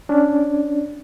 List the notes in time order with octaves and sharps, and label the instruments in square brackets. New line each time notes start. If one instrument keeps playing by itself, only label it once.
[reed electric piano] C#4 D4